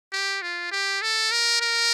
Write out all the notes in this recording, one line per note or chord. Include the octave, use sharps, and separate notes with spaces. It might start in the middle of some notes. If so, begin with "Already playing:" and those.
G4
F4
G4
A4
A#4
A#4